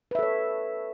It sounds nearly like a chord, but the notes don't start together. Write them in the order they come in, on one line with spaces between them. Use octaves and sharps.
B4 E5 A4 C#5